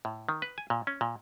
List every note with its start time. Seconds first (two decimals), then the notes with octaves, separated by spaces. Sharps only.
0.05 A2
0.29 D#3
0.42 B4
0.58 G#5
0.70 A#2
0.87 C#4
1.01 A#2